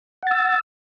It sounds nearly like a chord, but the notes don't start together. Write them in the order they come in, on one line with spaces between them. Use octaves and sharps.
F#5 A6 E6